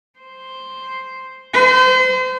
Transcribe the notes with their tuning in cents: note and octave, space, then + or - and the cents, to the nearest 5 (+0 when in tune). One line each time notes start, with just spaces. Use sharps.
C5 +0
C5 -35